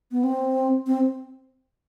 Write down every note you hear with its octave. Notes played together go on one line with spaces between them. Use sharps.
B3
C4
C4